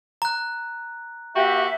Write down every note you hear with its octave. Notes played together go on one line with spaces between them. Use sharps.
A#5 F#6
A#3 F#4 G4 E5